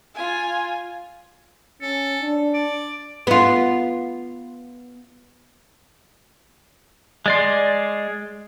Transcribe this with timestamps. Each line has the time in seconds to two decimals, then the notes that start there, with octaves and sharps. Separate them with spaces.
0.15 F4 G#5
1.82 C#4 A4
2.21 D4
2.54 D5
3.27 B3 F4
7.26 G#3 D5 C6